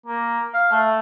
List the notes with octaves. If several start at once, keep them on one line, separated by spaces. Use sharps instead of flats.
A#3
F5
A3